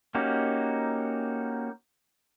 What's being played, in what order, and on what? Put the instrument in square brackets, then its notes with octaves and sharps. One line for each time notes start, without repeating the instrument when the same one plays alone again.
[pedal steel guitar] A#3 C#4 D#4 F#4 G4